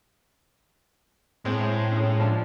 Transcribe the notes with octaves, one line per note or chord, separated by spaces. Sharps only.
A2 G#3 C4
G#3 C#4
F3 D4